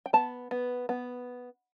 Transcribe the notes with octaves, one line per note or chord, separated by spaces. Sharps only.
G5
B3 A5
B3
B3